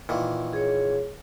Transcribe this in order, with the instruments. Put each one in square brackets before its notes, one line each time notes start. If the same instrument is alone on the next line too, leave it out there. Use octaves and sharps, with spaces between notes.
[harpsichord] A#2 D#3 E3
[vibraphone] G#4 C#5